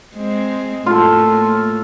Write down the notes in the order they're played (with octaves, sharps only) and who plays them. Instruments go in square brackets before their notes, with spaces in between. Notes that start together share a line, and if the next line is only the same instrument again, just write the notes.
[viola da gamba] G#3 C4
[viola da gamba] A2 A3 A#3 [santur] F4 A4